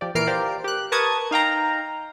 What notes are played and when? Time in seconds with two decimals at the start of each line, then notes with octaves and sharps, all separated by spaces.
0.01 F3 G4 D5
0.15 A#2 E3 A#4 F6 C7 D7
0.27 F4 G4 A#4 C5 D5
0.64 G4 F#6
0.92 A#4 B4 A5 C#6 D#6 G#6
1.31 D#4 F5 G5 A#5